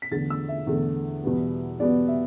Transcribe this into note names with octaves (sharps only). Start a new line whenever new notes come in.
B6
E2 D3 A3 A6
E6
E5
E2 D3 A3
E2 B2 G3 B3
E2 B2 G3 B3 D5
E5